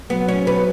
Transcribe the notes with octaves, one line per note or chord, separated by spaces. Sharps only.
F#3 B3
C#4
B3